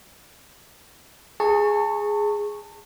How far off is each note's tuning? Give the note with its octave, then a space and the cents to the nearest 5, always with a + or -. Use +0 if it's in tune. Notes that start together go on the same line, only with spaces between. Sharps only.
G#4 +0 A5 +35 C#6 -5